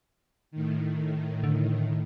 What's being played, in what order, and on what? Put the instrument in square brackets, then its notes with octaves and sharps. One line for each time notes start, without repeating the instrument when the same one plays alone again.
[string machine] A2 D#3
[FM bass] D3